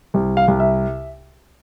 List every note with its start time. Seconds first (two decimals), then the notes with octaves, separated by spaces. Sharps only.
0.14 C2
0.37 F5
0.48 C2
0.60 E5